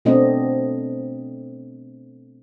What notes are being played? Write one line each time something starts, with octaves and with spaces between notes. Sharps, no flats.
B2 A3 B3 C4 D4 D#5